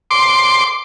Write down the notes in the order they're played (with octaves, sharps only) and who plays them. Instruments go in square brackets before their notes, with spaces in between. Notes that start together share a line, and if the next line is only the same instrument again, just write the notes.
[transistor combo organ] C6 D6